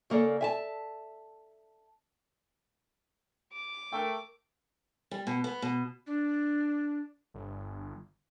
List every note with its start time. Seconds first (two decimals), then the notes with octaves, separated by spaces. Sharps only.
0.10 C#3 A#3 A4 D5
0.41 E5 G#5 A5
3.53 D6
3.93 A3 A#4 G5
5.11 G3
5.27 B2
5.44 B3
5.62 B2
6.06 D4
7.34 G1